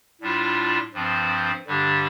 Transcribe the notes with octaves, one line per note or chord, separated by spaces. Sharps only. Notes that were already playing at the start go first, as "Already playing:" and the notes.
A2 G3 D4 F4
G2 F3 C4
G2 D3 G3 D4 G4